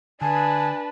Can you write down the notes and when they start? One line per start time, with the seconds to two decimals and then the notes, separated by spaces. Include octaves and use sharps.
0.21 D3 D4 B4 G#5 A5